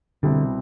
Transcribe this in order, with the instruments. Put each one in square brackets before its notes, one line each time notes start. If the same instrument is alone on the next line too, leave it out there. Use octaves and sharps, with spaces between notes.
[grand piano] C2 B2 G3 C4 E4 [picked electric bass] D3